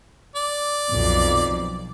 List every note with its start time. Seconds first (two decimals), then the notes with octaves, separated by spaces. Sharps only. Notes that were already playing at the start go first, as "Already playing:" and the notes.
0.36 D5
0.90 B1 F2